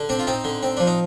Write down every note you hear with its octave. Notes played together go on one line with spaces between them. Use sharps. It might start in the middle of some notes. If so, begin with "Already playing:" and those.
Already playing: D3
C4 D4
F4
C4 D#4
D3
C4
F3 D4
D#4